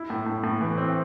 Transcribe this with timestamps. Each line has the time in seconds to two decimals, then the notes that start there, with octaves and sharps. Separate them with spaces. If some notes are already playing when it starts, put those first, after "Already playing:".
Already playing: E4
0.10 A2
0.26 A2
0.44 A2
0.61 E3
0.78 C4